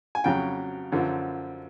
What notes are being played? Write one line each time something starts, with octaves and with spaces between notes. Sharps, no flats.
G#5
F2 C#3 F#3 G5
F#2 D3 F3